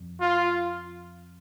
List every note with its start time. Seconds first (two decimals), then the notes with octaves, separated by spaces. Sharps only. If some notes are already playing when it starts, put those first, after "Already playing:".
Already playing: F2
0.21 F4